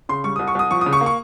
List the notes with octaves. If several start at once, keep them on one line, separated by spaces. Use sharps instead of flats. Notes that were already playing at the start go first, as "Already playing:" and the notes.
C#3 C6
G3 C#6
D#6
C2
C#6
C2 D#6
F3 C#6
C#3 D#6
C#6
A#3
C#6